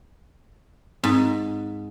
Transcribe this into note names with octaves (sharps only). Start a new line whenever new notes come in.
G#2 C4